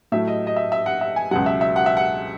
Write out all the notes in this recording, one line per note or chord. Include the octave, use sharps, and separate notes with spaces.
A2 F#3 A3 E5
D#5
D#5
E5
E5
F#5
E5
G#5
C#2 B2 F#3 F#5
E5
E5
F#5
E5
F#5